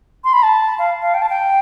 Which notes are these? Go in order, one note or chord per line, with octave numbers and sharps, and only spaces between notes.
C6
B5
A5
F5
F5
G5
A5
G5